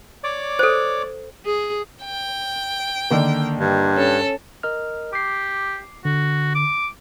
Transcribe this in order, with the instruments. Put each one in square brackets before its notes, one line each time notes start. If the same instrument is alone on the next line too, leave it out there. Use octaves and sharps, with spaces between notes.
[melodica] C#5 D5 D6
[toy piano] A4 C5
[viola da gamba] G#4
[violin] G5
[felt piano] D3 D#3 A#3
[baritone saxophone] G2
[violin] C#4 A4
[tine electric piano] A#4 D#5 F6
[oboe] G4 [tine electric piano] D6 C7
[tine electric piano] D3 [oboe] F#4
[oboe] D6